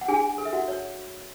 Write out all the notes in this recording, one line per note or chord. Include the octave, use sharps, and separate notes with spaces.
F#5
D4 G#4 G#5
A4
E5
F#4 F#5
C#5